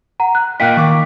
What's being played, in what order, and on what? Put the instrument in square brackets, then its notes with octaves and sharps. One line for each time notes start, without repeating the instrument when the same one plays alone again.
[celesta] F#5 A#5
F#6
[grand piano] A#2 A#3 F4 [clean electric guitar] D#5 G5 [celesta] F#6 B6
[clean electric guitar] D#3 [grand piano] C#6 D6